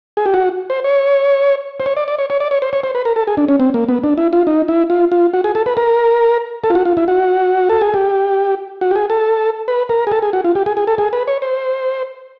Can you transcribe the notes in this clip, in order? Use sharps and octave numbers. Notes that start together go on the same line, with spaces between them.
G#4
G4
F#4
C5
C#5
C5
C#5
D5
D5
C#5
C#5
D5
C#5
C5
C#5
C5
B4
A#4
A4
G#4
D4
C#4
C4
A#3
B3
D4
E4
F4
D#4
E4
F4
F4
F#4
G#4
A4
B4
A#4
A4
F4
F#4
F4
E4
F#4
A4
G#4
G4
F#4
G4
G#4
A4
B4
A#4
G#4
A4
G#4
F#4
F4
G4
G#4
G#4
A4
G#4
B4
C#5
C5